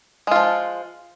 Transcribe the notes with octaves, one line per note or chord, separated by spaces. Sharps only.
F3 G#3 F4